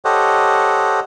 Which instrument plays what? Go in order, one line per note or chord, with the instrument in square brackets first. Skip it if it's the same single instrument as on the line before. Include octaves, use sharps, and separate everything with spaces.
[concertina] G4 A4 C5 C#5 D#5 F#5